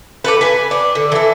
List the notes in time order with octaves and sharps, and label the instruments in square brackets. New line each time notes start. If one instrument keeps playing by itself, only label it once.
[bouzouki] G4 A4 B4
B4 G#5
D4
D3
E3 A4